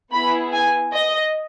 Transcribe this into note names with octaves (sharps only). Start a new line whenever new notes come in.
B3 E4 G#4 B5
G#5
D#5